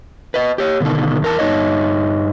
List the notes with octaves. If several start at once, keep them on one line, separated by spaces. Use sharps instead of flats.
B4 D#5
G4 C#5
B2 D3 D#3 A4
E2 A#4 A5
G2 D#4 C#5 D#5